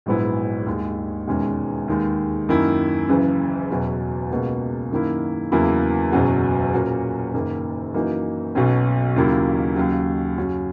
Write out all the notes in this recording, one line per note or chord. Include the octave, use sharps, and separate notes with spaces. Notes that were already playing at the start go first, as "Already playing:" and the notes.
A#1 G#2 F#3 B3 E4
D#2 D#3 G#3
E1 E2 D#3 G#3 C#4
D#2 D#3 G#3
F#2 D#3 A#3 E4
F#1 F#2 C#3 E3
E2 B2 F#3 C#4
C#2 B2 A#3
F#2 D#3 A#3 E4
E2 C#3 F#3 A#3 E4
F#1 E2 B2 F#3 C#4
A#2 A#3 C#4 F#4
F#1 F#2 D#3 A#3
F#2 E3 A#3 D#4 F#4
B1 B2 F#3 C#4
D#2 C#3 F#3 A#3 E4
D#2 C#3 F#3
F#2 C#3 F#3 C#4 F#4